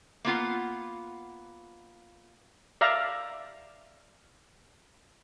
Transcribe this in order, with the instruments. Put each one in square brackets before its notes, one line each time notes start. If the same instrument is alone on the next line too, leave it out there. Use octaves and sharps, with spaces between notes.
[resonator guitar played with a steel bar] A#3 B3 F4 F#5
[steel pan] D5 E5 F5 A#5